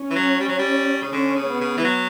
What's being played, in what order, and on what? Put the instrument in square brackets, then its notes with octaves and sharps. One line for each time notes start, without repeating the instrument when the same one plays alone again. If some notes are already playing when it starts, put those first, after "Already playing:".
Already playing: [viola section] C#4
[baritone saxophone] E3
F#3
G3
F#3
G3
C#3
[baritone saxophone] D3 [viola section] C#4
[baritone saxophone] C#3
[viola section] B3
[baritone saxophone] C#3
E3
F#3